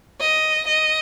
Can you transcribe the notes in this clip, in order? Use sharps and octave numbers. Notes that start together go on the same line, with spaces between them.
D#5
D#5